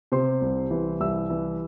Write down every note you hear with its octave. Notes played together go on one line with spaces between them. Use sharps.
C3 C5 C6
C2
E3
C2 E5 E6
E3